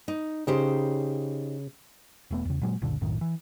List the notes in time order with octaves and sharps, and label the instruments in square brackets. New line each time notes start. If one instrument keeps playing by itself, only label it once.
[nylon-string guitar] D#4
[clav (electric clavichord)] C#3 [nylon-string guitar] D#4 G4 C5
[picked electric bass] E1 A3 B3
E2 C#3
A#2 F#3 G#3
F#1 C#2 A#2 D3
B1 F#2 A2 D#3
E3